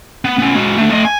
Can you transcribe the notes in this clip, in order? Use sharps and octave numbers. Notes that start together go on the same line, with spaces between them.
B3
B3 C#4
G#3 F#4
A3 D4
A3 D#5
G#5